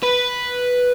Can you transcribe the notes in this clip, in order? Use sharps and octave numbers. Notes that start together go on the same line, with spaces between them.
B4